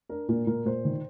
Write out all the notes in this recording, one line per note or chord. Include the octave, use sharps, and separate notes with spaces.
D4 A#4
A#2 A#4
A#2 A#4
A#2 C5
D#3